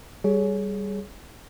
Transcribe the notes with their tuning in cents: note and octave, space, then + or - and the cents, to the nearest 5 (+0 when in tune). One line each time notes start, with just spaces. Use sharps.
G3 +0 G#4 +20 C#5 +15